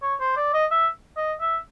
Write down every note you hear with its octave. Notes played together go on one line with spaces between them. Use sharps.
C#5
C5
D5
D#5
E5
D#5
E5